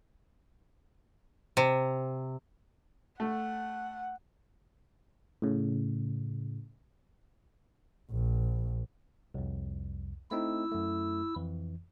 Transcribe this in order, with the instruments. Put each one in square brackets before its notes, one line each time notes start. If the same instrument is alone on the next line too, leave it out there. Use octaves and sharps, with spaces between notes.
[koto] C3
[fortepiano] A3 [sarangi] F#5
[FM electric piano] A2 C#3
[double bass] A#1
[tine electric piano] C2 F2
[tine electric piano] A3 C4 D#4 [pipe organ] E4 E6
[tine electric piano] F#2 A3
F2 E3